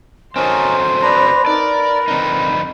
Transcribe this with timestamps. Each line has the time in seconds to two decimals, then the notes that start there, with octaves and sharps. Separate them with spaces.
0.36 C4 C#4 D#4 F#4 A4 A#4 C5 C6
1.02 D4 B4 A#5
1.46 D#4 A#4 B4 D5
2.08 F2 D3 C4 D#4